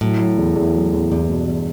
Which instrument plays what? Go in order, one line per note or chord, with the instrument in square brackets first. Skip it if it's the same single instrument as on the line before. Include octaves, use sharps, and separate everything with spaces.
[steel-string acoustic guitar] A2 [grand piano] F#3
[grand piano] F#3
E2
E2
F#3
E2
[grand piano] E2 [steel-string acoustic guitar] G2
[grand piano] B2
E2